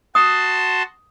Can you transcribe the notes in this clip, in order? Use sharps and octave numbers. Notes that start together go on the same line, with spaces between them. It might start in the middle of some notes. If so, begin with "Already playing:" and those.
F#4 A5 C6 D#6